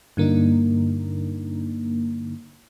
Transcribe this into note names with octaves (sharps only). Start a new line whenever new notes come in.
G2 D3 A#3 D4 D#4